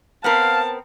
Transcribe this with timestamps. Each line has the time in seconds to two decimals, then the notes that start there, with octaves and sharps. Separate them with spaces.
0.24 B3 C4 A#4 F5 A5